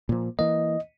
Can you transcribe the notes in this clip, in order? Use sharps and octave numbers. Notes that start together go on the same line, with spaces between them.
A#2 F3
E3 A#3 D#5